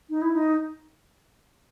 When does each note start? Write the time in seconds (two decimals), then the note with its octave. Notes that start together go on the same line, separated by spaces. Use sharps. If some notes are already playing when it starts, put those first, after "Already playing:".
0.10 D#4
0.22 E4
0.33 D#4